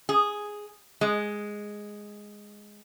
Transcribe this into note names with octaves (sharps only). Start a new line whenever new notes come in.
G#4
G#3